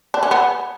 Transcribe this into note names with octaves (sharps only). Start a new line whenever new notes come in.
D4
C#4
B3